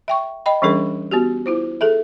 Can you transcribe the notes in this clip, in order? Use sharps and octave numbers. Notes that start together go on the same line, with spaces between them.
E5 G5 C#6
D#5 G5 B5
E3 G3 C#4 D4 G#4 A#4
B3 F#4 G4
E4 F4 C5
G#4 A4 E5